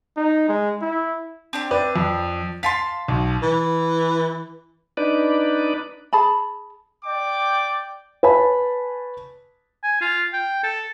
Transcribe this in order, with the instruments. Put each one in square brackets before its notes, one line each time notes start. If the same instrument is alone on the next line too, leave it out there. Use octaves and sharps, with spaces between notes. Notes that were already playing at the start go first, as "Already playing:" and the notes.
[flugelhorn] D#4
G#3
E4
[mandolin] C4 D4 G4
[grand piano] B4 D5
F2
[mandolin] F5 A5 C6 [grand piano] B6
[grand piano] B1
[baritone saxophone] E3
[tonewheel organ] D4 D#4 B4 D5
[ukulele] G#4 A5 B5
[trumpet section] D5 G5 D6
[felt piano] B4 C#5 G#5 A5 B5
[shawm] G#5
F4
G5
A4